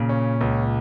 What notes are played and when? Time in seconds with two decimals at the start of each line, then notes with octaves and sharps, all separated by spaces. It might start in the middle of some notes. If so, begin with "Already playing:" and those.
Already playing: A#2 C#3
0.09 C#4
0.41 C#2